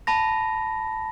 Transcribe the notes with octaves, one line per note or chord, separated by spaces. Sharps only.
A5 B5 A#6